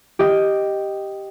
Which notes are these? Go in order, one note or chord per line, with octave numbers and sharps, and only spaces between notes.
G4 D#5